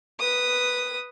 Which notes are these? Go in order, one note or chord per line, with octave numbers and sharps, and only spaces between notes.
B4 D#6